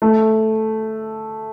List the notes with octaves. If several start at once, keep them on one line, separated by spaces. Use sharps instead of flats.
A3